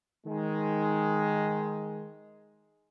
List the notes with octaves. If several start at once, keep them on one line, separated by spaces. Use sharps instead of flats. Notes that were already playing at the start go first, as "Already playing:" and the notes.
D#3 G#3